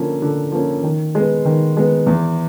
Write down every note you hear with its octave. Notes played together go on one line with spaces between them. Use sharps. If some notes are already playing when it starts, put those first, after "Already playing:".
Already playing: D3 F3 A#3 C#4
D3
F3 A#3 C#4
D#3
G#3 B3
D#3
G#3 B3
E2